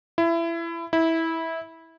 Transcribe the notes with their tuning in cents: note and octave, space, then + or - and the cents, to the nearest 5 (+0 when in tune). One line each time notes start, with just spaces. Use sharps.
E4 +25
E4 -15